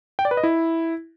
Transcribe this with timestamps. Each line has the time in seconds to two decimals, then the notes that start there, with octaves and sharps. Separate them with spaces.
0.19 G5
0.25 D5
0.31 B4
0.37 D#5
0.43 E4